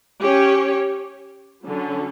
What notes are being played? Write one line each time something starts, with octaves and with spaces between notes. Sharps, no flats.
C#4 G4 C#5
D3 F#3 C#4